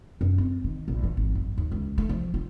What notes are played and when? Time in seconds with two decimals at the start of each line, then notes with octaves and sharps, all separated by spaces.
0.21 F#2
0.38 C4
0.64 D#3
0.88 A#1
1.03 E3
1.17 G#1
1.35 F#2
1.57 D#2
1.72 C#2
1.98 A3
2.09 F3
2.34 F4